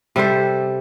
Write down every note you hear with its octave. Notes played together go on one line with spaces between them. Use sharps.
C3 G3 A4 C5